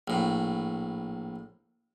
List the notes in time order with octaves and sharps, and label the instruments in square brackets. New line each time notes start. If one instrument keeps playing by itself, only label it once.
[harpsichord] A#1 A2